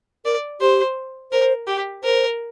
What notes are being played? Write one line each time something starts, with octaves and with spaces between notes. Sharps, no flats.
A#4 D5
G4 C5
A#4 C5
G4
A#4 C5